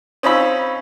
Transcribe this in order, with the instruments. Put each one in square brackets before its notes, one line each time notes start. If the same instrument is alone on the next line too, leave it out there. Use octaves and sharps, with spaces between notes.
[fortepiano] C4 C#4 D#4 F4 B5 E6